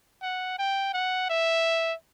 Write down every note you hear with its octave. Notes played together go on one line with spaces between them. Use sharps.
F#5
G5
F#5
E5